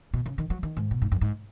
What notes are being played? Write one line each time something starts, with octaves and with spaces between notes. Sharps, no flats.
B2
C#3
D#3
F#3
D#3
G#2
B2
G#2
F#2
G#2